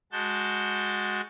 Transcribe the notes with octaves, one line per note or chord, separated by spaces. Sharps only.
G#3 F#4 A5 G6